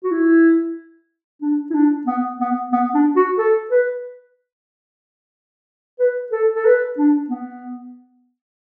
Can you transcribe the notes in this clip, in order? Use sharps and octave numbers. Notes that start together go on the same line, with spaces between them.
F#4
E4
D4
E4
D4
B3
B3
B3
D4
F#4
A4
B4
B4
A4
A4
B4
D4
B3